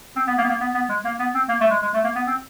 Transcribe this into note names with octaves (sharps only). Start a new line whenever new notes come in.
C4
B3
A#3
B3
A#3
B3
B3
G#3
A#3
B3
C4
A#3
A3
G#3
G#3
A3
A#3
B3
C4